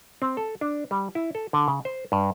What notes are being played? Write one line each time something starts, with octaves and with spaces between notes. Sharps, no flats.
C4
A4
D4
G3
E4
A4
D3
C#3
C5
G2